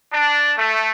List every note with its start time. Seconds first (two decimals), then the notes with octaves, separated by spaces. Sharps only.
0.12 D4
0.58 A3